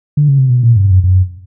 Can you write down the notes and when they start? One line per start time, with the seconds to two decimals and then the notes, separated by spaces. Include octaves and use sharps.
0.17 D3
0.28 C#3
0.39 C3
0.50 B2
0.63 A#2
0.76 G2
0.90 F#2
1.04 F#2